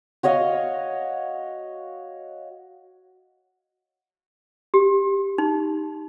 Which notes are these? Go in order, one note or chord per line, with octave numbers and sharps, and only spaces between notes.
F#4 C#5 D#5 F5
G4
D#4